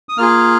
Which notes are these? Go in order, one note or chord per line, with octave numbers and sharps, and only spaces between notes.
D#6
A#3 F4 G#4 F6